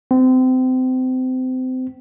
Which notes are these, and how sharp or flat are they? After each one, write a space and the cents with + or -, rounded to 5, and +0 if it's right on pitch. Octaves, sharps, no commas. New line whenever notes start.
C4 -30